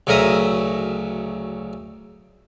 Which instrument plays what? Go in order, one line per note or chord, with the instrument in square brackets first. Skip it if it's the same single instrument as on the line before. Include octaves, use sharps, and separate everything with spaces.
[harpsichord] D2 C#3 F#3 A#4 E5 D#6